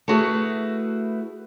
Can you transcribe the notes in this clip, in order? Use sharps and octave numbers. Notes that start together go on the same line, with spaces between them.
A3 E4 F#4 G#4 B4